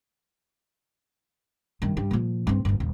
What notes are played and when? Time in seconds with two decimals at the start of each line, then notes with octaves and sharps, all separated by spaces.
1.82 G2 D#3
1.97 G2
2.11 A#2 F3
2.47 G2 C4
2.65 G1 A#2
2.80 D#1